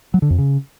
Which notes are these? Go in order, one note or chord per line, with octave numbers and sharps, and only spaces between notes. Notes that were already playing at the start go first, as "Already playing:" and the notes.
F#3
D3
F2
C#3